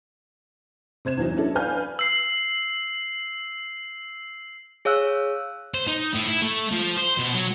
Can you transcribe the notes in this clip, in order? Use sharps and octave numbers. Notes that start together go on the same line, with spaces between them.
C3 C5 G#6 E7
E2 G2 E3 F#3 D#4
F#3 C#4 D4 E4 A4
B4 D5 F5 G#5 F6 G6
E6 C7
G#4 C#5 F5 E6 F#6
C5
D#4
A2
E4
A3
F3
C5
B2
F#3